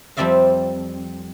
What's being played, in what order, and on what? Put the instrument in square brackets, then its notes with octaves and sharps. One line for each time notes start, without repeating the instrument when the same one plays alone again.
[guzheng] F2 G3 C4 D5 E5 F5